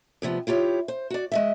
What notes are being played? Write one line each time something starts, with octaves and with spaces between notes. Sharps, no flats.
D2 C3 F3 B3
E4 F4 G4 C#5
C5
F#4 D5
G#3 D#5 E5